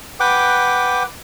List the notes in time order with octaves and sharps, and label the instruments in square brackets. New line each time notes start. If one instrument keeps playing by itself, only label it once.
[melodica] B4 F#5 G5 D6